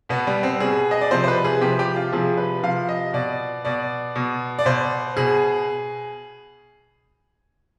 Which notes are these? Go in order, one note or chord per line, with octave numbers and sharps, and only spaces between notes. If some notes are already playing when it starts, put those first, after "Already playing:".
B2 B3
G3
C4
B2 G#4
D#5
D5
C3 F3 C5
C5
B4
G#4
C3 F3 G4
G4
F4
C3 F3 G#4
B4
C3 F3 F5
D#5
B2 D5
B2 D5
B2
D5
B2 C5
B2 G#4